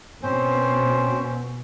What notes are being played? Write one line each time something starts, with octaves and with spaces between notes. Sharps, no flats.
B2 C4 C#4 C5